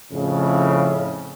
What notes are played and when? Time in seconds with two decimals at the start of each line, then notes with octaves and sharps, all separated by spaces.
0.12 F2 A2 C#3